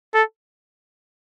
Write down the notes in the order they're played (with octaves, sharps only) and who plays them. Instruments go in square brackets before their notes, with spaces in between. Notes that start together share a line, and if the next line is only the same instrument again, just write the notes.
[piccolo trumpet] A4